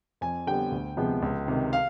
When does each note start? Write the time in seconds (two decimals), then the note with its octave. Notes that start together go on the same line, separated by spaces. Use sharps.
0.21 F2 G#5
0.47 D3 G3 B3 G5
0.72 D2
0.97 C3 F3 G#3 B3
1.22 C#2
1.48 C3 D#3
1.73 F5